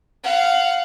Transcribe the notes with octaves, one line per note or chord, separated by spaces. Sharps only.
F5 F#5